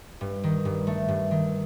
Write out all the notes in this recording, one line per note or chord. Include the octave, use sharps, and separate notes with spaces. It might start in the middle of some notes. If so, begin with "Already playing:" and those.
G2
D#3
G2
A3
G2
D#3